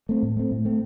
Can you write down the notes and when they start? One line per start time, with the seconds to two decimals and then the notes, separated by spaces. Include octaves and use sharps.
0.09 A3 C4
0.23 A2
0.37 A3 C4
0.51 A2
0.65 A3 C4